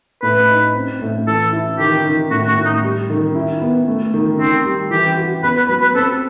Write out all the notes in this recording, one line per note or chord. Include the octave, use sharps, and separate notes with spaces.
A2 B4
D#4
C4
A2
E3 A4
E4
D#3 G4
D#3
A2 F#4
F#4
A2
D#4
G3
D#3
E4
B3
A3
D#3
D#3 C4
G3
E3 G4
F#4
E2 B4
B4
F#3 B4
B4
C4 A4